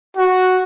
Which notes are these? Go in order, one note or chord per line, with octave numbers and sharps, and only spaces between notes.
F#4